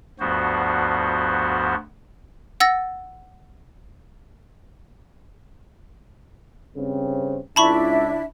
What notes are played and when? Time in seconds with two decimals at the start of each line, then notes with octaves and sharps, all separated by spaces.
0.20 D2 G2 F3 B3 F#4 C5
2.60 F#5 E6 A6 A#6
6.77 G2 C#3 C4
7.56 C#2 D4 E4 E5 A5 B5 C#6